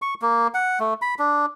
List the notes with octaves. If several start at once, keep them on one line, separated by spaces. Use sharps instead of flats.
C#6
A#3
F#5
A3
B5
D4